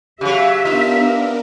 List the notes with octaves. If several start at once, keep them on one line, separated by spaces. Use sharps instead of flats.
C#3 F#3 G4 E5
B3 D4 D#4 F4 A#4